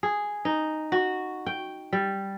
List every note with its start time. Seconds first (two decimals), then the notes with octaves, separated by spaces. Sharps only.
0.03 G#4
0.45 D#4
0.92 F#4
1.46 G5
1.93 G3